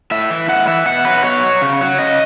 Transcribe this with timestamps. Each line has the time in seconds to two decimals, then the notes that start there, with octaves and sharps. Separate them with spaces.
0.11 A2 E5
0.30 E3
0.48 A2 F#5
0.67 E3 E5
0.86 B2 F#5
1.05 F#3 B4
1.23 B2 C#5
1.43 F#3
1.62 C#3
1.81 F#3
1.99 C#3 D#5